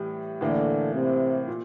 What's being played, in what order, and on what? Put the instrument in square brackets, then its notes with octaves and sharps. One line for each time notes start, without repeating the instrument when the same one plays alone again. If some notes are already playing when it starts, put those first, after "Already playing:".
Already playing: [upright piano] A2 E3 G3
[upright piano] A2 E3 A#3 [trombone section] D3
[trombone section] C3
[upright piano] A#2